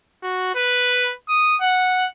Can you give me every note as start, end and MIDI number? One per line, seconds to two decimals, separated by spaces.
0.23 0.51 66
0.55 1.12 71
1.28 1.56 87
1.61 2.06 78